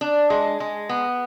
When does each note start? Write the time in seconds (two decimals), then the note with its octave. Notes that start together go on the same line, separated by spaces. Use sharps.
0.01 D4
0.30 G#3
0.60 G#3
0.89 B3